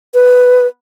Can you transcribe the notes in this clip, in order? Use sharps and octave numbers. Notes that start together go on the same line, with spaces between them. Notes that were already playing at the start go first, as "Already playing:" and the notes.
B4